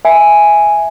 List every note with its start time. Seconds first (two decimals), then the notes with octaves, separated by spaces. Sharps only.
0.05 E5 G#5